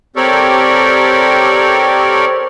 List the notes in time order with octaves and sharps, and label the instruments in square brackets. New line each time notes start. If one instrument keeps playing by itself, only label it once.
[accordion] C4 G4 A4 A#4 C#5 D5